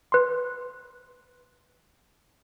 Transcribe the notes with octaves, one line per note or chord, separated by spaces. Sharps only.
B4 C6